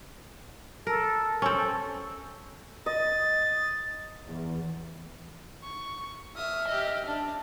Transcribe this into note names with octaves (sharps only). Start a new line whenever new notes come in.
A4 A#4
C4 C#4 A4
D#5 A6
E2
C#6
E5 D#6 F6
G4 D#5
D4